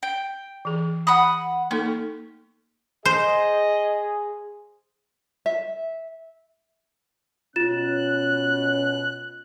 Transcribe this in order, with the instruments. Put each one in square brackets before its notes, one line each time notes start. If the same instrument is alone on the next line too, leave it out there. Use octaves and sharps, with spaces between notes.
[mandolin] G5
[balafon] E3 G#4
[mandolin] F#5 B5 D#6
[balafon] A#3 D#4 A4 [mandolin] C#4
[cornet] G#4 [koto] C5 [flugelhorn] D#5
[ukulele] E5
[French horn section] B2 C#4 [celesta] F4 A6 E7 [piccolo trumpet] F#6